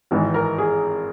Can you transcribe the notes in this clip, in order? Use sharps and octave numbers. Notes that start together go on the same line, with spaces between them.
G#1 G#2 E3
A#4
G#4